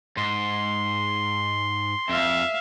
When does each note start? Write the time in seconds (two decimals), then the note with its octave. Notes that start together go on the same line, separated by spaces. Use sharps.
0.17 G#2 C6
2.10 F2 E5 F5